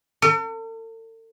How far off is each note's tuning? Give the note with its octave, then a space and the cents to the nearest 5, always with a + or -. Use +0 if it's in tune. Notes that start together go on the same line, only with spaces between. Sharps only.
A4 +45